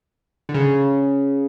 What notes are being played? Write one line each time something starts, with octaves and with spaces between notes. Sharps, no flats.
D3
C#3